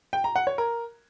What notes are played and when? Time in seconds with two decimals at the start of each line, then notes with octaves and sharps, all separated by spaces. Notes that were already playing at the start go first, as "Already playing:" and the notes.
0.13 G5
0.24 A#5
0.36 F#5
0.47 C#5
0.58 A#4